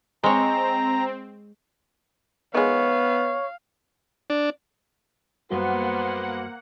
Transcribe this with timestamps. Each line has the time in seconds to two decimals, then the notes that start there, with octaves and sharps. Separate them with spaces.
0.24 G#3 C4 C#5 A#5
2.54 D#3 G#3 B3 C#5 F5
4.30 D4
5.51 F#2 G3 A#3 B3 F#4 C5 F#5